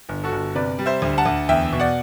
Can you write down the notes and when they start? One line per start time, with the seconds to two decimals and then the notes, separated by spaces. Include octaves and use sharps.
0.09 G1
0.24 F#4 A4
0.32 G1
0.55 C3 B4 D5
0.79 G3
0.86 C5 E5
1.02 D2
1.18 F#5 A5
1.26 D2
1.49 E2 E5 G5
1.73 B2
1.80 D5 F#5